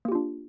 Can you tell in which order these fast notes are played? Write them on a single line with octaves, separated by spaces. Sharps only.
A#3 G4 F4 D4